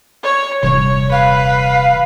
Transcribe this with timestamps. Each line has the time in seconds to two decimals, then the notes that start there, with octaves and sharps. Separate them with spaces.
0.23 C#5
0.63 D#1 C3 E3 G3 C#5
1.12 B4 F5